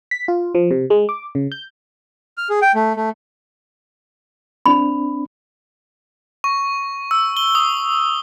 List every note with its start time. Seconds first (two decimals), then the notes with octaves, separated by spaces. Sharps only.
0.11 B6
0.28 F4
0.55 F3
0.71 C3
0.90 G#3
1.09 D6
1.35 C#3
1.52 G6
2.37 F6
2.50 G#4
2.62 G5
2.75 A3
2.96 A3
4.66 C4 D4 B5
6.44 C#6
7.11 E6
7.37 G7
7.55 D#6